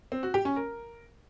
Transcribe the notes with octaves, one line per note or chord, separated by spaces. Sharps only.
C4
F#4
G4
C#4
A#4